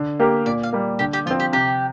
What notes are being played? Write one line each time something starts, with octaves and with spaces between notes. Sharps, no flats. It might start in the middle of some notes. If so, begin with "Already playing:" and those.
Already playing: D3
A#3 G4 A#4
A#2 D5
F5
G3 A#3
D3 G4
G4
F3 C4 F4
G4
C3 G4